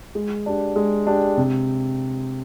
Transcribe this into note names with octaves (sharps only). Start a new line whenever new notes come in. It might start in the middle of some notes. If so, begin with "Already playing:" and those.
G#3
D4 G4
G#3
D4 G4
C3